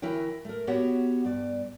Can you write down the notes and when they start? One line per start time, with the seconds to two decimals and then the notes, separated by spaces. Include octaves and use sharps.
0.02 D2 E3 E4 A#4 C#5 G5
0.45 A3 A#4
0.67 B3 F#4 G4 C#5 F#5
1.24 G2 D5